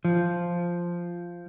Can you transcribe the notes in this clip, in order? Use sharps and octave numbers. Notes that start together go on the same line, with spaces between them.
F3